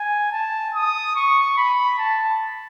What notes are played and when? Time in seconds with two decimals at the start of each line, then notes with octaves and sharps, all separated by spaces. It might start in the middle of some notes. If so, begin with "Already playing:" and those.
Already playing: G#5
0.32 A5
0.75 D#6
1.16 C#6
1.57 B5
1.98 A5